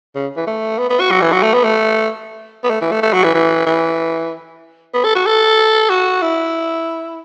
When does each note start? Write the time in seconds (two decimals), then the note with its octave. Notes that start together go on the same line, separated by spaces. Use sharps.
0.15 C#3
0.37 E3
0.47 A3
0.79 B3
0.90 B3
1.00 F#4
1.11 F#3
1.22 E3
1.32 F#3
1.43 A3
1.54 B3
1.64 A3
2.64 B3
2.70 A3
2.81 E3
2.92 A3
3.02 A3
3.14 F#3
3.24 E3
3.34 E3
3.66 E3
4.94 B3
5.05 A4
5.15 F#4
5.26 A4
5.89 F#4
6.22 E4